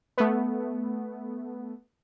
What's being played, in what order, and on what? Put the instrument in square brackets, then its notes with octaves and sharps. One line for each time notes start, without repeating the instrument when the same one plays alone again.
[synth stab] A3 B3